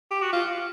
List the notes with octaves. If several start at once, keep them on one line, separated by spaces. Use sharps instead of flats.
G4
F#4
F4